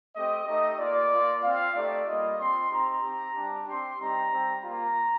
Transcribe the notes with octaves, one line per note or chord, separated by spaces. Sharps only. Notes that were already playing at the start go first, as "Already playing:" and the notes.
A3 C4 G4 D#5
A3 D#4 G4 D#5
A#3 F4 D5
A#3 F4
C4 F4 F5
A3 D#4 G4 D5
G3 A#3 F4 D#5
C4 F4 C6
C4 D#4 G4 A#5
C4 G4
G3 D4 G4
C4 G4 C6
G3 C4 D#4 G4 A#5
G3 C4 G4
A#3 F4 A#5